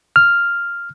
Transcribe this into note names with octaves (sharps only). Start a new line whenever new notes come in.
F6